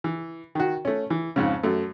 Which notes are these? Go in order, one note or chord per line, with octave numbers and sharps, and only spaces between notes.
E3
D#3 F#4
A3 C#4
E3
F2 G#2 C#3
F#2 A3